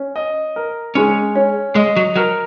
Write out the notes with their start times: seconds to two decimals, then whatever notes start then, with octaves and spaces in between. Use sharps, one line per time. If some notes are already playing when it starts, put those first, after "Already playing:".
Already playing: C#4
0.16 D#5
0.56 A#4
0.95 G#3 C#4
1.35 C#4
1.75 G#3 D#5
1.96 F#3
2.16 F#3 A#4